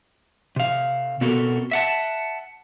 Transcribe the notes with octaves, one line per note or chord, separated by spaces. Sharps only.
C3 F5
B2 B3 C4 F#4 A4 A#4
E5 F#5 A5